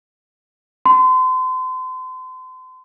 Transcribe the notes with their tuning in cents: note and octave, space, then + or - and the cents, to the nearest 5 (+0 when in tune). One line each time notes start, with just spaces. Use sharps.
C6 -35